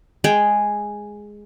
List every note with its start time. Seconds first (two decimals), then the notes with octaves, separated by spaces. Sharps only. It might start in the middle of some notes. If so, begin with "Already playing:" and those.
0.24 G#3 G#4 G5